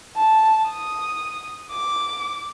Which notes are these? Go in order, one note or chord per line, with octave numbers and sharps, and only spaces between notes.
A5
D#6
D6